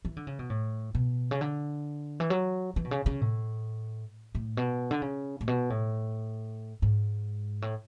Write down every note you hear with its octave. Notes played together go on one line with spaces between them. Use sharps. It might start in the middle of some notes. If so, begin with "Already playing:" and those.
E3
D3
C#3
B2
A2
B2
C#3
D3
E3
F#3
E3
B2
C#3
C#3
A2
A2
B2
D3
C#3
A2
B2
A2
G#2
A2